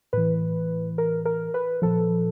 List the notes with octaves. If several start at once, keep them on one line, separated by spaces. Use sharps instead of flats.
A2 E3 B4
A#4
A#4
B4
A#2 F3 A4